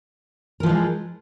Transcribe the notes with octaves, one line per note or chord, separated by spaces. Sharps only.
E3 F3 G#3 A#4